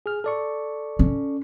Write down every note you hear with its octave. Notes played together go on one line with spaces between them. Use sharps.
G#4 F6
A4 D5 C#6
C#4